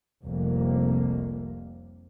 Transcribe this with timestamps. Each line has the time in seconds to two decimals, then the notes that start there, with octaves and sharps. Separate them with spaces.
0.24 F1 C2 F2 C3 A#3